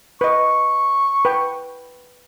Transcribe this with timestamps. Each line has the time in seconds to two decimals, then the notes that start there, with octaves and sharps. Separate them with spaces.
0.21 B4 D#5 C#6
1.25 B4 G5